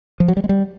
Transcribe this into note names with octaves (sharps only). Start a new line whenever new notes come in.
F3
F#3
G3
G#3
G3